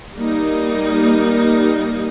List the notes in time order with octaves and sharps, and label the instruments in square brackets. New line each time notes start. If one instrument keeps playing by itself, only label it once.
[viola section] G3 A#3 D#4